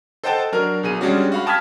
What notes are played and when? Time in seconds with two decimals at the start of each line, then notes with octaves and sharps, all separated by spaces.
0.24 A4 C5 D#5 F#5 G5 A5
0.52 F#3 D4 A#4 F6
0.83 B1 G#4 D#7
1.01 G3 G#3 C#4 D4 F#4
1.32 F#4 F5 B5
1.46 G5 A5 D#6 F6 G#6 B6